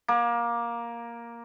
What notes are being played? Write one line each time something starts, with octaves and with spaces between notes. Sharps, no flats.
A#3